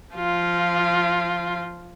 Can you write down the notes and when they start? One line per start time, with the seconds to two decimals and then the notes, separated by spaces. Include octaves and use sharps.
0.15 F3 F4